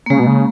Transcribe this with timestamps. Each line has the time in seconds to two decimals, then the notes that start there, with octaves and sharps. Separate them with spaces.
0.06 A#3
0.10 C#3 G#3
0.19 B2
0.27 C#3